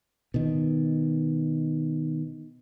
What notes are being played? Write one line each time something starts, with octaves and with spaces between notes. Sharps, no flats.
B2 D#3